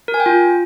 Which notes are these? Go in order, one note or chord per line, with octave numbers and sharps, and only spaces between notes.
A#4
G#5
G5
F4